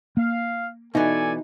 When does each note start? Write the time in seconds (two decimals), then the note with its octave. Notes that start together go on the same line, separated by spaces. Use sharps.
0.17 A#3 F5
0.95 B2 E3 D#4 A4 D5 G#5